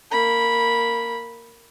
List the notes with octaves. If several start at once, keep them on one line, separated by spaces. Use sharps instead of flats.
A#3 B5